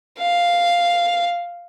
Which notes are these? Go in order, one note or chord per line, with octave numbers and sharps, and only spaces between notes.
F5